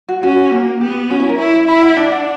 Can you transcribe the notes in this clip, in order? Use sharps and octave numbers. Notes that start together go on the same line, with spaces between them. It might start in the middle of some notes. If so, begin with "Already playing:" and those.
F#4
C#4 F#4
A#3 F#4
B3 G4
C#4 F#4
E4
A#4
E4 C#5
E5
E4 B5
F#5
D4 G5
F#5